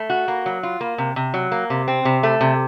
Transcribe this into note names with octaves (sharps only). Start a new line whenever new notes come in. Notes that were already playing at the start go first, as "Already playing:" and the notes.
Already playing: A3
F#4
A#3
F#3
F4
A#3
C3
C3
F#3
A#3
C3
C4
C3
A3
C3